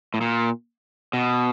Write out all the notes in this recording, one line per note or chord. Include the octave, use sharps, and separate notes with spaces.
A2
A#2
B2